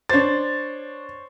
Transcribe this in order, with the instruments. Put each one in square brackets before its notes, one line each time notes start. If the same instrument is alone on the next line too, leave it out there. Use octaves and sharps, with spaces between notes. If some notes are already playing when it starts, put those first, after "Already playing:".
[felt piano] D4 A6 [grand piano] C5 C#5